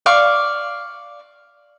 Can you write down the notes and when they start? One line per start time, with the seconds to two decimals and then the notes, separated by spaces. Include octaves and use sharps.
0.06 D5 F5 C#6